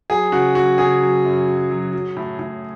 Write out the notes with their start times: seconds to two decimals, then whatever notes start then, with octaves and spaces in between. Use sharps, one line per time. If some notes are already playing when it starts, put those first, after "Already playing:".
0.10 F#3 G#4
0.32 C#3 F#4
0.55 F#3 F#4
0.78 C#3 G#4
1.01 F#3
1.25 F#2
1.48 F#3
1.70 F#3
1.93 F#3
2.17 A2
2.39 A2